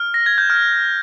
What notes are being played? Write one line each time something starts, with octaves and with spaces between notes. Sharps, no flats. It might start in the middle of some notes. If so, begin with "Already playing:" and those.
Already playing: F6
A#6
G#6
G6
F6